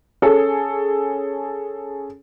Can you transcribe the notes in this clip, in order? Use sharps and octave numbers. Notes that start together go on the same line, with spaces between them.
C#4 G#4 A4